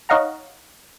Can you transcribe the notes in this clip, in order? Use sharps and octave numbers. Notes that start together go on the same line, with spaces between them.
D#4 C#5 D#5 F5 F#5 A#5